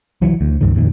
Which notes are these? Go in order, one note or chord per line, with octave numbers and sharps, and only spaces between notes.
C2 E3 F#3
D2
C#2 G2 D#3
F2 A#2 D#3